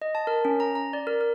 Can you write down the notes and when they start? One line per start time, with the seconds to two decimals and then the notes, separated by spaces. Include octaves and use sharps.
0.02 D#5
0.15 A5
0.27 A#4
0.45 C#4
0.60 A#5
0.75 A#5
0.93 D5
1.07 A#4
1.21 A#4